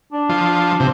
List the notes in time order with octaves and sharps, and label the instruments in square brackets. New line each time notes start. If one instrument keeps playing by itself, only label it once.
[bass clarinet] D4
[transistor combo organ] F3
C3